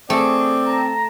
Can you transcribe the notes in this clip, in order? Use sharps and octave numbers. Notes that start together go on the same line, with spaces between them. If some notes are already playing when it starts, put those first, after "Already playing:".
A3 C4 G#4 D5
A5 A#5